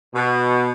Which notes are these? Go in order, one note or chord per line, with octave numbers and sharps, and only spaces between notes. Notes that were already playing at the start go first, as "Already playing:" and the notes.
B2